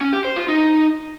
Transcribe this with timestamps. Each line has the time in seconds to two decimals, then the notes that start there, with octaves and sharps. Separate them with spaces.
0.01 C#4
0.13 G4
0.25 C5
0.36 F4
0.48 D#4